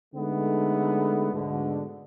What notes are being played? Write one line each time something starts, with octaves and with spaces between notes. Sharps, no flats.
D3 G#3 A3 B3 D#4
D2 G#2 B2 D3